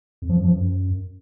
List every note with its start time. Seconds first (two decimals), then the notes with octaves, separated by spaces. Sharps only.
0.22 F2
0.29 F3
0.37 F#2
0.45 F3
0.52 F#2